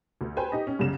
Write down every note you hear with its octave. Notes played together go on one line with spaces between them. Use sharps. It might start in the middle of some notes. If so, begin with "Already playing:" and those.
D2
B4 C5 G5 G#5
D#4 G4 D#5
C#4
C2 F#2 C#3 E7